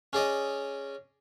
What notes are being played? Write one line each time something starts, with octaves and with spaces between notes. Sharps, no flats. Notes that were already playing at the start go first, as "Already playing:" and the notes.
C#4 G#4 D5 D#5